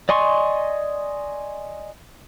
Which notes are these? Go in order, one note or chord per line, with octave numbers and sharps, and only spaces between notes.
D5 D#5 G#5 C6 C#6